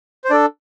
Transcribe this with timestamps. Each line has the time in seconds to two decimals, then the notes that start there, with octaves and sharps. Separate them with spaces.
0.24 C5
0.30 D4 A4 D5